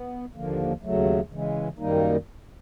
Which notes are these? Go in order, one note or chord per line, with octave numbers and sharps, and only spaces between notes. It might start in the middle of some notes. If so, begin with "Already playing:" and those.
Already playing: B3
D#2 D3 F3 A#3
D#2 C#3 F#3 A3
C#3 E3 G#3
F#2 D#3 G3 A#3 D#4